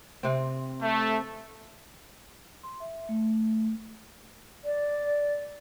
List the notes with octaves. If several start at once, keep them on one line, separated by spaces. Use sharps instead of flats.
C3 C4
A3
C6
E5
A3
D5